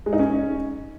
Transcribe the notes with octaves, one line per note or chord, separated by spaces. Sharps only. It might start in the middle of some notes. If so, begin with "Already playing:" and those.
G#3
D#4
C#4